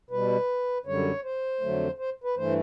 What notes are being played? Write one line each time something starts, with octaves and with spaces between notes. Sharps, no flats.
B2 G3 B4
F#2 D3 G3 C#5
C5
F2 D3 F#3 A3
C5
B4
G2 E3 A3 C5